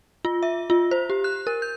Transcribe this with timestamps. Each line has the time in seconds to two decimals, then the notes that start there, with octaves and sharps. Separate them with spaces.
0.25 F4
0.43 E5
0.70 F4
0.91 C5
1.10 G4
1.24 F#6
1.47 A#4
1.62 G6